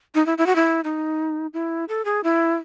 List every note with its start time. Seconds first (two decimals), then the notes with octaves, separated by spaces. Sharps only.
0.15 D#4
0.26 E4
0.38 E4
0.46 F#4
0.55 E4
0.84 D#4
1.53 E4
1.88 A4
2.05 G#4
2.24 E4